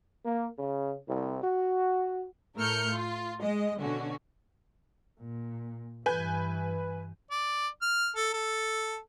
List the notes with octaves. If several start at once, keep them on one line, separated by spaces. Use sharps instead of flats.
A#3
C#3
C2
F#4
A2 A3 A#4 F6 G6 C#7
F4
G#3 D#5
B2 D3 C#4 F#4
A#2
G2 E3 B4 G#5 G6
D5
F6
A4
A4